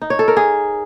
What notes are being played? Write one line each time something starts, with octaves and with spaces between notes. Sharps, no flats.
D#4
C#5
A4
A#4
G#4